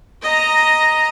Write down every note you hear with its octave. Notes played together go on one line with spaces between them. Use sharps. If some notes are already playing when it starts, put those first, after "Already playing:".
D#5 A#5